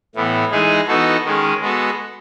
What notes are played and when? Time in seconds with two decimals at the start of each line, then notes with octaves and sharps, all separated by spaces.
0.15 A2 E3 B3
0.51 E3 G#3 D#4 G#4
0.88 E3 B3 D#4 F#4 A4
1.25 D#3 G#3 C#4
1.61 G#3 B3 F#4 A4